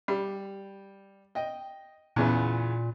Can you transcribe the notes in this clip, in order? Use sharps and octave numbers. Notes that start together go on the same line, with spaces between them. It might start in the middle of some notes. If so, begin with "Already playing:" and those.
G3
D#5 G5
E2 A#2 C#3 B3